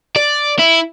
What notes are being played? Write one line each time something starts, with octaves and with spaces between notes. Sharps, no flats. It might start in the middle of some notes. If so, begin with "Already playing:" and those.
D5
E4